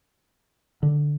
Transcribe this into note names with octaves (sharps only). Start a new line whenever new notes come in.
D3